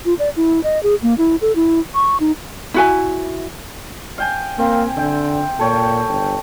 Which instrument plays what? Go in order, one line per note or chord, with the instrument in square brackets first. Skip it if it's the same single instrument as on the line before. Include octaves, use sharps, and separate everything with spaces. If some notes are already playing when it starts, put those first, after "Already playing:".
[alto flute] F4
D5
E4
D#5
G#4
A#3
E4
A4
E4
C#6
D#4
[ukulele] E4 F#4 G#5
[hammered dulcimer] F5 G5 G#5
[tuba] A#3 [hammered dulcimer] C4
[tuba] D3 [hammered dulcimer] E5 G5
[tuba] A#2 [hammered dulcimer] A4 C#5 G5
[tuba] G1